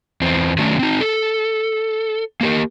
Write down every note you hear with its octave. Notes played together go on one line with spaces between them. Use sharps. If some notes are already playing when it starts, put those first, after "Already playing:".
E2 C4
D#3 F#3 A3 C#4 D4
C4 D#4
A4
A#3 G4 A#4